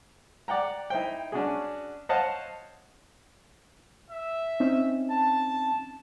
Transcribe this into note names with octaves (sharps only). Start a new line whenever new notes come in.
D5 F#5 G5 A#5
D#4 E4 C5 G5
C#4 D4 F#4 G#4
C5 C#5 D#5 F5 F#5 A5
E5
C4 C#4 D#4
A5